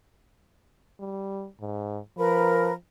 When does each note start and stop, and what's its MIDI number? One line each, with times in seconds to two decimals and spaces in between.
1.00 1.47 55
1.61 1.99 44
2.18 2.74 53
2.18 2.72 70
2.18 2.72 71
2.18 2.72 83